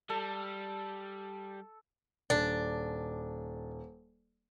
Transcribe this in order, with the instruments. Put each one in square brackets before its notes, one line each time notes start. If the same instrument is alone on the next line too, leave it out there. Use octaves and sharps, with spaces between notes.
[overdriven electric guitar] G3 [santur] A4
[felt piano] D#1 [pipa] D4